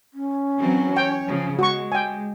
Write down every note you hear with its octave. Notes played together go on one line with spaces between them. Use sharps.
C#4
E3 F#3 C4
C#5 G5
C#3 F3
G#3 F#4 C#6
G5 G#5